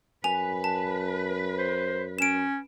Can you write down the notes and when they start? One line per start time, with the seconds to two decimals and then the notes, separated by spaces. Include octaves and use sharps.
0.24 F#2 B4 G#5 F7
0.64 A5
1.58 C5
2.19 C#4 D7 E7